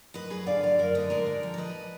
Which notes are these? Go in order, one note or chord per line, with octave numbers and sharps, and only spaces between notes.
F#2 B4 D#5
F#2 G#4 B4
D3 D5 F5
F#2 D5 F5
F#2 A#4 D5
D3 B4 D#5
G#3 A#4 D5
D3
F3
D5
D2 B4 D#5